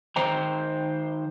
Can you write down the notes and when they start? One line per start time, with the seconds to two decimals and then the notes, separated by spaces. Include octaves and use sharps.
0.16 D#3 C5 G5 A#5